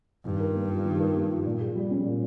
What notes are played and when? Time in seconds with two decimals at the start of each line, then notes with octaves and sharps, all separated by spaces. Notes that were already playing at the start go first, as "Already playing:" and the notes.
0.25 G2 D#3
0.40 A#4
0.55 A#3
0.70 F4
0.85 D#3
1.00 A#4
1.15 A#3
1.29 F4
1.45 A#2
1.61 G#4
1.75 G3
1.90 C#4
2.05 A#2